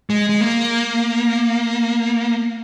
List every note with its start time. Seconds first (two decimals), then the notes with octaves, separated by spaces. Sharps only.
0.10 G#3
0.29 G#3
0.41 A#3